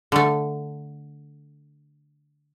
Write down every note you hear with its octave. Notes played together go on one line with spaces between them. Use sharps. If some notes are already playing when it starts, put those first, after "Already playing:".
D3 A3